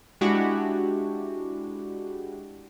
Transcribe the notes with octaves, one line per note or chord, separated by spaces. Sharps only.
G#3 D4 E4 F#4 G4